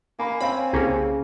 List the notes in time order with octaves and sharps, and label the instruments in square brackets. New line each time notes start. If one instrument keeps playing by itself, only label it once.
[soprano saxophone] A#3 [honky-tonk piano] G#5 B5
[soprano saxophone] C4 [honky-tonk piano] C#5 F5 G#5 [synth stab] B5
[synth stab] C2 A#3 C#4 [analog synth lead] C#3